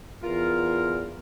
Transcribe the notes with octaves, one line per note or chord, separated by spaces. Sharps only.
E2 F4 A#4